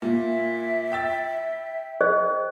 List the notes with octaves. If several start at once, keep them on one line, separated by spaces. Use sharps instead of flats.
A#2 E5
G5 E6 A6
G#4 C5 D#5